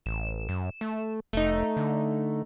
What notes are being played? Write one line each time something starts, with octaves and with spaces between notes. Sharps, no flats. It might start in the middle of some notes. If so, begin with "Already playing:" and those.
A1 E7
F#2
A3
F1 A3 D#4
D3